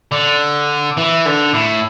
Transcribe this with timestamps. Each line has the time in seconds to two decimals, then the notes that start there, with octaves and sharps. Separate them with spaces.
0.12 D3
0.97 E3
1.25 D3
1.54 A2